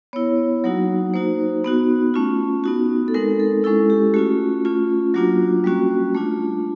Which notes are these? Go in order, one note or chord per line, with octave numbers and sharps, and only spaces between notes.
B3 E4 C#5
F#3 A#3 D#4 F#4
A#3 D#4 F#4 C5
B3 D#4 F#4
A3 C#4 F4
B3 D#4 F#4
A4
G#3 C4 D#4 A#4
A4
G#3 C#4 E4 A4
G4
A3 C#4 F4 F#4
A3 C#4 F4
F#3 A#3 D4 F4 F#4
G3 A#3 C#4 F#4
A3 D4 F4